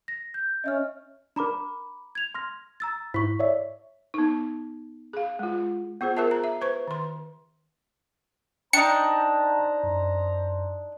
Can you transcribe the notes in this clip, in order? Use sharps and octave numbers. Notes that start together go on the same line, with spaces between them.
A#6
G6
C#4 D#5 E5 F6
D4 A#4 A#5 B5 D6
G#6 F7
C6 F6 A#6
A#5 E6 A6
G#2 E4 C#6 B6
C#5 D5 E5
B3 D#4
G#4 F5
G#3 F4
B3 F4 G#4 C5
F4 G#4 A#4 C5 E5 A5
A#5
E5
B4 C5 C#6
D#3 C6
D4 D#4 C5 G5 A5 A#5 C#7
F#2